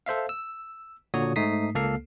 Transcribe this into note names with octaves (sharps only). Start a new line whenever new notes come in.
A4 C5 E5 F5
E6
A#2 D3 F#4 C#5 D#6
G#2 A3 D#4 D#6 B6 C7
C#2 A#3 A4 F6 C7